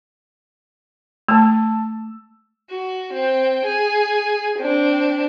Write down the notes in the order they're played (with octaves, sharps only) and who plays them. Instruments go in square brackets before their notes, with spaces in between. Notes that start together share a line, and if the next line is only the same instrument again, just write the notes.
[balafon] A3 [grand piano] A5 E6
[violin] F#4
C4 G5
G#4
C4 D4